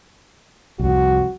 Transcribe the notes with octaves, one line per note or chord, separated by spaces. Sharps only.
C2 F2 F#4